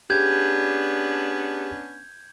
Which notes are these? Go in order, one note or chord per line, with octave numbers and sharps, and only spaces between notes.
B3 C#4 D4 G4 G#4 G6 G#6